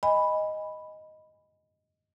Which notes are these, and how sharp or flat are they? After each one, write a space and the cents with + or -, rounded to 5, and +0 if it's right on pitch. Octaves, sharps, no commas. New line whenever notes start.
D#5 +0 G#5 -25 B5 +0